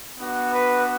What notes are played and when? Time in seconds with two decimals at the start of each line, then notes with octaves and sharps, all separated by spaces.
0.17 B3 D4 F#4
0.51 B4